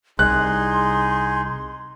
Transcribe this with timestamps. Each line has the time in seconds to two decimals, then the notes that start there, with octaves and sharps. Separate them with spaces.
0.19 C2 D#4 G#4 C6 F#6